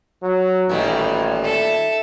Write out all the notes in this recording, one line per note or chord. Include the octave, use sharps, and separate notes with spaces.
F#3
A1 A#2 D#3 G3
A4 E5